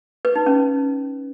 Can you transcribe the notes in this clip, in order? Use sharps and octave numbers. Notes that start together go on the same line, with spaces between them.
B4
D#4
C#4